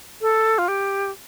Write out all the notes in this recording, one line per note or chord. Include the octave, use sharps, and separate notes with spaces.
A4
F4
G4